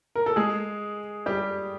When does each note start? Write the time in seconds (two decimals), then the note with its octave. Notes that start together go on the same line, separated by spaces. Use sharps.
0.15 A#4
0.26 A4
0.36 G#3 G#4
1.26 G3 G4